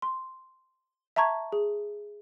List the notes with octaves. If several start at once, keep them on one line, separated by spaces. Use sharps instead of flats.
C6
E5 A5 A#5 C#6 G#6
G#4